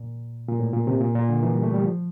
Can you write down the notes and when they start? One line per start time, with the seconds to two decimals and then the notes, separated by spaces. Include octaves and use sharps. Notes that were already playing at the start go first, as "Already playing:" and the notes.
Already playing: A#2
0.49 A#2
0.59 A2
0.73 A#2
0.87 C3
1.01 A#2
1.15 A#2
1.29 D3
1.43 E3
1.52 G3
1.63 A3
1.74 G3
1.84 F3